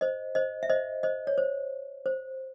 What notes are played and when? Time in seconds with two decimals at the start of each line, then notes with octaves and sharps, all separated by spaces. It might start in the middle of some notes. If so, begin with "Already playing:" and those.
0.01 C5 D#5
0.35 C5 D#5
0.63 E5
0.70 C5 D#5
1.03 C5 D#5
1.27 C#5
1.38 C5
2.06 C5